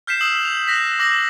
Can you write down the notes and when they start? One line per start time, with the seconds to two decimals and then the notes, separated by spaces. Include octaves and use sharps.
0.07 F6 G6 B6 C7 E7
0.21 D#6 E6 F#7
0.45 F7
0.68 F#6 A#6 B6
0.99 D6 E6 A#6 F#7